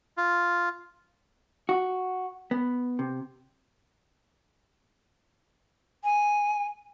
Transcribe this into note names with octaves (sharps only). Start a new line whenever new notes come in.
F4
F#4
B3
C3
G#5